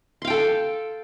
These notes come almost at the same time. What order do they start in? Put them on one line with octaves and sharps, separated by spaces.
C6 F5 G5 A4